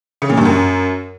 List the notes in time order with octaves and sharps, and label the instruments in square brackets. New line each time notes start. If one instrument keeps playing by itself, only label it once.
[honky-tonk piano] C#3
A#2
G2
F#2